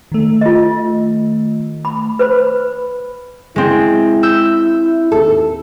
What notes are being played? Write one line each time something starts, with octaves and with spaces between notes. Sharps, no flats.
D#3 A3
F4 D#5
B5
B4 C5 B5
G#3 C4 E4
E6 G6
D#2 A4